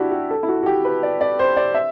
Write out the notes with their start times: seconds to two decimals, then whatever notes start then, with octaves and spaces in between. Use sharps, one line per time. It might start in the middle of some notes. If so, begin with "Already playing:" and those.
Already playing: D4 E4 F#4 G4
0.12 F#4
0.30 A4
0.43 E4
0.48 F#4
0.63 F#4
0.66 G4
0.85 B4
1.03 D5
1.21 D5
1.39 C5
1.56 D5
1.75 E5